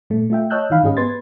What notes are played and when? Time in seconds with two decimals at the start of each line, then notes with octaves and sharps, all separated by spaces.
0.10 A#2 A3
0.30 A3 F4 E5 G5
0.50 C#5 D#5 A5 E6 F#6 G6
0.70 D#3 E3 D#4 F5 B5
0.83 G#2 C#4 G4 G#4 D#5
0.97 B3 B4 C6 G#6 A6